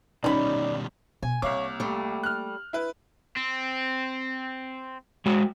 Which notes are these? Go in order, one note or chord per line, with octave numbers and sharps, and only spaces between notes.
B2 D#3 G3 C#4 D#4 D5 B5
B2 G#5
C2 A#3 C#5 F5 D6
G3 A3
F6 F#6
E4 B4
C4
G#3 F#4